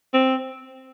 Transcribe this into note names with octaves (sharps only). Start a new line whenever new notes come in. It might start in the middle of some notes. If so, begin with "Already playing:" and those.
C4